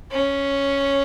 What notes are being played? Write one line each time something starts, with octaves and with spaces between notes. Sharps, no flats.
C#4